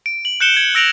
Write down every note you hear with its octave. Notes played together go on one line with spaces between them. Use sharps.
D7
F#7
F#6 G6 C#7 E7 G7
G#6
E6 A#6 D7 F7 F#7